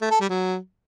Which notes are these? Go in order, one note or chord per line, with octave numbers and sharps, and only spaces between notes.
A3
A4
G3
F#3